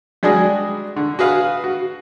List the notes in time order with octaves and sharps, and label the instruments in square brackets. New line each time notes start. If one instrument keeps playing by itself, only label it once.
[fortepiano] G3 G#3 D4 F#4 G#4
D3
F#4 G#4 B4 F5
F#4